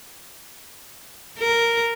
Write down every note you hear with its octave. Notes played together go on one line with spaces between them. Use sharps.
A#4